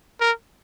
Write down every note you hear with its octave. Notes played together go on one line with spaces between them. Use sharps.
A#4